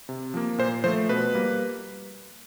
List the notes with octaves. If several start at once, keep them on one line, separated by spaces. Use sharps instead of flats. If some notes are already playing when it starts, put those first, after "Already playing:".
C3
F3 A#3
A#2 C5
F3 A3 C5
B2 B4
G3 A#3